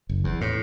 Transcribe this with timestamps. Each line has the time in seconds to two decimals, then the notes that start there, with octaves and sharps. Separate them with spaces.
0.09 F#1
0.24 E2
0.41 A2